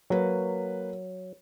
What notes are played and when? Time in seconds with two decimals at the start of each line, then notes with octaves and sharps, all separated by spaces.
0.10 F#3 A#3 B4